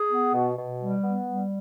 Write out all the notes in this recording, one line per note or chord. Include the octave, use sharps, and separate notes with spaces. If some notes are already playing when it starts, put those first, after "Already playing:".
Already playing: G#4
B3
B2
B2
G3
B3
G3